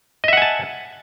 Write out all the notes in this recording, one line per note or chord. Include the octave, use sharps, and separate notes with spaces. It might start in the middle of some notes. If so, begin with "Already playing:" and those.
D#5 E5 F#5 G#5 A5